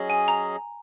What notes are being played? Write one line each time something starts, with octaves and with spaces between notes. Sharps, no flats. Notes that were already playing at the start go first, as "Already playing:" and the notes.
Already playing: F#3 C#4 G#4 D#5
G#5
A#5